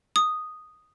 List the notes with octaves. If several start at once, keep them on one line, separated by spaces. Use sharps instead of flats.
D#6